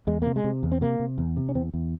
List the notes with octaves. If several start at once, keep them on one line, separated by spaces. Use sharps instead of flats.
E2 G#3
C3 A#3
G#3
C3
E2
C4
C3 A#3
C3
E2
C3
C#4
E2 C4
E2